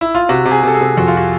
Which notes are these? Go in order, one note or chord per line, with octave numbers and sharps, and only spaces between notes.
E4
F4
C3 F#4
C3
G#4
C3 A4
G#4
C3
F2 F#4
F4
F#4